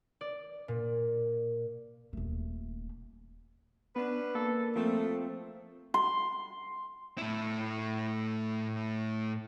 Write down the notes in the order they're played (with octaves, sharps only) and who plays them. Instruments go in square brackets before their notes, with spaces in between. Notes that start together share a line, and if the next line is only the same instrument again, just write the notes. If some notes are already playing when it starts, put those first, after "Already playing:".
[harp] D5
A#2
[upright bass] D#1 A3
[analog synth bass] B3 [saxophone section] C#4 D4 B4
[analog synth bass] A#3 [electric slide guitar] A4
[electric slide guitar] F3 C4 [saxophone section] A3
[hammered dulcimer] C6
[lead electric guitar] A2 E4